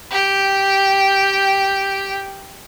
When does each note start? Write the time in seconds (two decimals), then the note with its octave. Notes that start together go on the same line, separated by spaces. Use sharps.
0.10 G4 G5